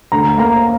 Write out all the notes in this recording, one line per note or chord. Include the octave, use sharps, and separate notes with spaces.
D2 A#5
A#3 A#5